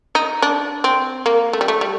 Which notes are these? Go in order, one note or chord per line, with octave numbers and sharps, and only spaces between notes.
D#4
D4
C4
A#3
A3
G3
A3
G3